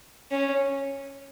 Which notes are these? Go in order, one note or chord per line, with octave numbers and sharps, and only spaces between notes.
C#4